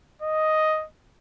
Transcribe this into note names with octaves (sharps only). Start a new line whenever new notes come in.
D#5